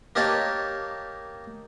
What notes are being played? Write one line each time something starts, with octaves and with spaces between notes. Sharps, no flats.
A#3 D#4 G4 C#5 A5